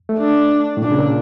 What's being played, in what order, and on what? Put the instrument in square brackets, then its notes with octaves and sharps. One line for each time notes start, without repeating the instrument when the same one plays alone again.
[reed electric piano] A3
[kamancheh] D4
[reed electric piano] A2
[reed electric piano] A#2 [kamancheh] D4
[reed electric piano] C#3
A#2